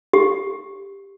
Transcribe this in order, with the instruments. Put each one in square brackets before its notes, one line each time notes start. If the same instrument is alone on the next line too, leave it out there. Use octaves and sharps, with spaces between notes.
[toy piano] G4